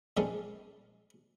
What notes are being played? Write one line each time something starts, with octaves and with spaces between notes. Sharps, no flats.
A#2 F3 G3 G#3 C#4 A4